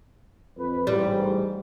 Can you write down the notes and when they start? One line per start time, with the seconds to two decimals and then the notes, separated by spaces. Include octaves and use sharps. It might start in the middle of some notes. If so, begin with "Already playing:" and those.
0.57 F2 B4
0.87 A1 G#2 G3